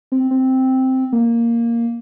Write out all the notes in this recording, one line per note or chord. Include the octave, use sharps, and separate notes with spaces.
C4
C4
A#3